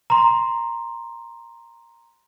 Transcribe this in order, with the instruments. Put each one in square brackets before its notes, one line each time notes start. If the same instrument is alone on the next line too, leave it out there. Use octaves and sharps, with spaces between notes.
[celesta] A#5 C6